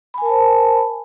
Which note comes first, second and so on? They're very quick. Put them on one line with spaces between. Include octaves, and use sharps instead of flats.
B5 G#5 A#4 A5 C5